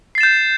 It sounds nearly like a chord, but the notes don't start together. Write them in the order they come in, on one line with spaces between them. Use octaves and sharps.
C7 A6 E7 G6